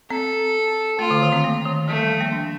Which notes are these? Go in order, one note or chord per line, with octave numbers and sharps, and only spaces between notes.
C4 A4
A3 F4
D3
D#3
C4
A#3
D#3
F3 A3
G3
A#3
D4